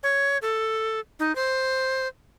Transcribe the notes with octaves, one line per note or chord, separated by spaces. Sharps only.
C#5
A4
D#4
C5